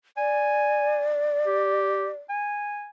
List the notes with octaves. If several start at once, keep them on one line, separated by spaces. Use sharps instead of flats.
D5 G#5
G4
G#5